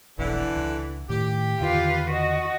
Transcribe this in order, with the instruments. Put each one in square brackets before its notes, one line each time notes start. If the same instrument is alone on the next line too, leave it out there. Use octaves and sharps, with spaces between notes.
[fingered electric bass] F1 B1 [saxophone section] D3 E3
[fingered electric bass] C#2
[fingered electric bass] A2 D#3 [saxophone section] G4
[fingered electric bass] E2 D3 D#3 [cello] F4 B4
[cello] F#4 D#5